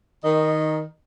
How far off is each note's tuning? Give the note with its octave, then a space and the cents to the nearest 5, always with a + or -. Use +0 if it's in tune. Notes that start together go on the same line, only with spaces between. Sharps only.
D#3 +10 D#5 -15